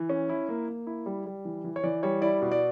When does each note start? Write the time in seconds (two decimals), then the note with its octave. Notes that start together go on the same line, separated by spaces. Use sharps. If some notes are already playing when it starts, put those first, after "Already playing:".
Already playing: E3
0.09 C#4
0.29 E4
0.49 A#3
0.68 A#3
0.87 E4
1.06 G3
1.26 G3
1.45 E3
1.64 E3
1.76 C#5
1.84 E3 D5
2.03 G3 C#5
2.22 E4 D5
2.42 B2
2.52 D5